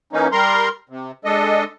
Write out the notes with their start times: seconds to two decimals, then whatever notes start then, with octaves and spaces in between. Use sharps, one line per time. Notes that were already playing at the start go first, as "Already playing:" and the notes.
0.13 E3 A#3 C#4 D#4
0.32 G3 A#4 A#5 C6
0.89 C3
1.25 G#3 D4 A4 D#5